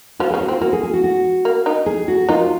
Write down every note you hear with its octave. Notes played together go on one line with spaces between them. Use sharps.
F3 F4 F#4
C#3 C#4 G#4
F#4
C4
F4
A#3 F#4
G#4
G#4
F#4
F#4
A#3
D#3 D#4
G#4
F#4
D#3 D#4 F4